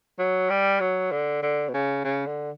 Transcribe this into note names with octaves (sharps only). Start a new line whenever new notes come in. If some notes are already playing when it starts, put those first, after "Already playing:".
F#3
G3
F#3
D3
D3
B2
C#3
C#3
D3